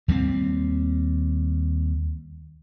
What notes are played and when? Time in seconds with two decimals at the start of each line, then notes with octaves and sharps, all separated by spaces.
0.08 D#2 G3 A3 C4